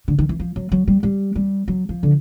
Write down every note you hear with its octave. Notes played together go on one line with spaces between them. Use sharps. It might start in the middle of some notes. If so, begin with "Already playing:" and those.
D3
D#3
E3
F3
F#3
F#3
G3
G3
G3
F#3
F3
D3